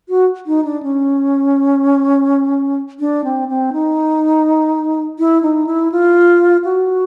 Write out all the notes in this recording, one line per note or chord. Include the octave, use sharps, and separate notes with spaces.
F#4
D#4
D4
C#4
D4
C4
C4
D#4
E4
D#4
E4
F4
F#4